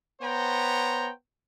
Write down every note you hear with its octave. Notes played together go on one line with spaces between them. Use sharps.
B3 C5 C#5 G5 A#5